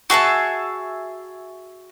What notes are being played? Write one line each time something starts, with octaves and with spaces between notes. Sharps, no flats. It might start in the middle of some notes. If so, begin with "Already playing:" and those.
F#4 G#4 E5 A5